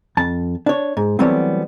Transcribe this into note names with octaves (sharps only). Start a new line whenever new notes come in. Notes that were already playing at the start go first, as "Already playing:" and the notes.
F2 A5
D4 C#5
G#2
E3 F#3 G3 A3 B3 C4